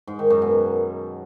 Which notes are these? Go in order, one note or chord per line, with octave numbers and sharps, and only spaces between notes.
G#2
D#3
F#2
B2